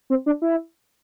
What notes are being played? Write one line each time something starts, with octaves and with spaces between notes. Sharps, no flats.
C4
D4
E4